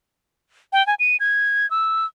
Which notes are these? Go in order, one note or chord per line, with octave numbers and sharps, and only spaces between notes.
G5
G#5
D#7
G#6
E6